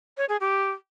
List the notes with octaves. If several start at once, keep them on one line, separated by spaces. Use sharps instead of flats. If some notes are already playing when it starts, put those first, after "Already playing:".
C#5
G#4
G4